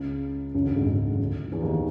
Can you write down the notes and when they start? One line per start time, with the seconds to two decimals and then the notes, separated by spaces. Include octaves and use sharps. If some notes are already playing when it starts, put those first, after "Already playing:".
Already playing: C#2 C#3
0.54 C#2 C#3
0.64 D2 D3
0.75 G#1 G#2
0.86 C#2 C#3
1.13 C#3
1.19 D2 D3
1.52 E2 E3
1.62 D#2 D#3
1.73 D#3